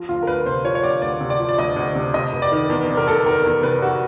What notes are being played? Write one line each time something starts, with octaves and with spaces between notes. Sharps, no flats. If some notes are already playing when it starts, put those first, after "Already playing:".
Already playing: F3
D2 F4
A#4
D2 B4
C3 C5
F3 C#5
C#5
D2 D5
D2 D5
C3
D5
F3
D5
D2 D#5
D2
C3
C3 D#5
F1
D5
D#3
E2
C3
A#4
F1 A4
D#3 A#4
E2
C3 B4
F1 F#4